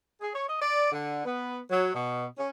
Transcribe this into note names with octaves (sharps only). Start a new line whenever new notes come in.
G#4
C#5
D#5
D5
D3
B3
F#3
B2
C#4